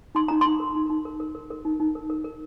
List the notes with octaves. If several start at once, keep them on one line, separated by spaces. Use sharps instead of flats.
D#4 C6
D#4 A#5
D#4 C6
A#4
D#4
D#4
A#4
A#4
A#4
A#4
D#4
D#4
A#4
A#4
A#4